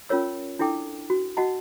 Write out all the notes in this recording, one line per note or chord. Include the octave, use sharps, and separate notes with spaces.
C#4 F4 A#4 C#5 E6
D4 E4 A4 G5 D6
F#4
F#4 D#5 F#5 A5